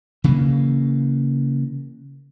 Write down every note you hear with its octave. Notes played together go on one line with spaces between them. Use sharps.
C#3 E3 A#3